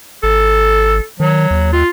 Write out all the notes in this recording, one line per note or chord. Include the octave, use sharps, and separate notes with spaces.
G#1 A4
D#3 F#3
D#2
F4